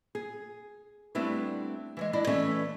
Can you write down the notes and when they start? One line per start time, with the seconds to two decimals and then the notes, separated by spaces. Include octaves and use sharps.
0.15 G#4
1.15 G3 A3 B3 C4 D4 E4
1.97 E3 F#3 G#3
2.13 D4 E4 D5 D#5
2.27 E3 A3 B3 C#4 E5